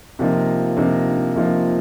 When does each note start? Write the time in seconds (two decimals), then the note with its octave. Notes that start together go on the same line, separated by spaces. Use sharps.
0.19 C3 F3 A#3 D#4
0.77 C3 F3 A#3 D#4
1.36 C3 F3 A#3 D#4